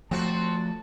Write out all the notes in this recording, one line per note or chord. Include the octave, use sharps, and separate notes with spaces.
F3 A3 C4 F#4 A5